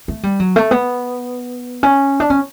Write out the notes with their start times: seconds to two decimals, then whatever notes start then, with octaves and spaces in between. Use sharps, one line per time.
0.08 A3
0.23 G3
0.40 F#3
0.56 A3
0.71 B3
1.83 C#4
2.20 D4
2.30 C#4